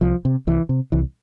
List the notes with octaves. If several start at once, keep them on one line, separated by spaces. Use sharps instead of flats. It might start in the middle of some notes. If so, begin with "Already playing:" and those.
C2 F3
C3
C2 E3
C3
C2 E3